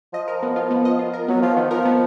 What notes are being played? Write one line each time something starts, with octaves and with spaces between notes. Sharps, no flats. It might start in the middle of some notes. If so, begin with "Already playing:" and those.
F3 D#5
A#4
B3
F4
B3
D#5
F4
A#4
F#3 B3
F3 F4
D#3 B3
F3 A#4
B3